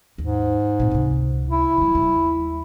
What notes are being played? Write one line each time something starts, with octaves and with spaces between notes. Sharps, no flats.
D#2 G#2
A#2 C4
C#2 C3
E4
C#3 G3
D#2 G3